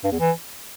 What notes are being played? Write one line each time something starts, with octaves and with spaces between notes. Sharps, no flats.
G2
E2
E3